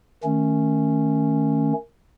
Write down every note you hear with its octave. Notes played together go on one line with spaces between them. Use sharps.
D#3 A3 C#4